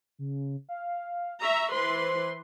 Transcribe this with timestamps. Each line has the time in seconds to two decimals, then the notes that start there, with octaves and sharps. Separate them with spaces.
0.19 C#3
0.69 F5
1.42 E5 A#5 C#6
1.72 E3 B4 C5 C6